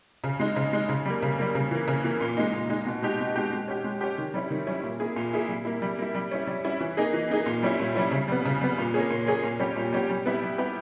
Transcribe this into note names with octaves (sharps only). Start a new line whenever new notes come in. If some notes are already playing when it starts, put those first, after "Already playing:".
C#3
G#3 D#4
C#3
G#3 D#4
C#3
G3 A#3
C#3
G3 A#3
C#3
E3 A#3
C#3
E3 A#3
A#2
G#3 D#4
A#2
G#3 D#4
B2
G#3 D#4 G4
B2
G#3 D#4 G4
G#3
C#4 G4
G#3
C#4 G4
D#3
G3 C#4 E4
D#3
G3 C#4 E4
A#2
A#3 E4 G#4
A#2
A#3 E4 G#4
G3
A#3 E4
G3
A#3 E4
G3
C#4 E4
G3
C#4 E4
E3
A#3 D#4 G#4
E3
A#3 D#4 G#4
A#2
G3 C#4 E4
A#2
G3 C#4 E4
C#3
G3 B3
C#3
G3 B3
A#2
A#3 C#4 G#4
A#2
A#3 C#4 G#4
A#2
G3 C#4 G4
A#2
G3 C#4 G4
G3
B3 E4 G4
G3
B3 E4 G4